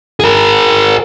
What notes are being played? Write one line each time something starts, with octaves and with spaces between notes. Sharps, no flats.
G#4 A#4